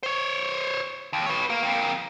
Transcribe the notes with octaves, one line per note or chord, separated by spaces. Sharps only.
C5 C#5
D#2
B4 C#5
A#4 F5
F2 A#3